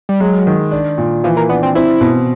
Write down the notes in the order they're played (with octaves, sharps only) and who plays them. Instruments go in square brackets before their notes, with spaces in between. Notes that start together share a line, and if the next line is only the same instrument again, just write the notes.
[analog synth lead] G3
[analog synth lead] F#3 [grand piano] G#3
[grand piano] D#3
D4
A#2
[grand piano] E3 [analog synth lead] F3
[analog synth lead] A#3
[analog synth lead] B3 [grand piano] D4
[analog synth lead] C4
[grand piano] C4 [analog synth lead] E4
[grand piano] B2